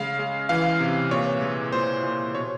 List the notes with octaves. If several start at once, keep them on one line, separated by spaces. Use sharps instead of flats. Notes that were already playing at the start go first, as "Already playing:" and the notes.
Already playing: C#3 G#3 F5
G#3
E3 F5
C3
A#2 C#5
G#3
A#2 C5
A#2
B2 C#5